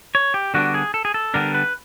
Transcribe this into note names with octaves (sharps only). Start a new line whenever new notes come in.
C#5
G4
D3 G3 B3 D4 F#4
G#4
A4
G#4
A4
D3 G3 B3 D4 A#4
B4